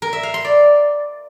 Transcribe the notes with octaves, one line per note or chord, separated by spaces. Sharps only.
A#4
E5
F5
C6
D5